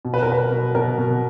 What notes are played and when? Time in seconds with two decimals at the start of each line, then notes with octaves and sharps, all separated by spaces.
0.05 B2
0.14 B4
0.23 A#4
0.27 B2 B4
0.51 B2
0.75 B2 A#4
0.98 B2